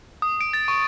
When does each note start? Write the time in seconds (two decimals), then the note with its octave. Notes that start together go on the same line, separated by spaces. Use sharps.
0.22 D#6
0.41 D7
0.53 A6
0.68 C#6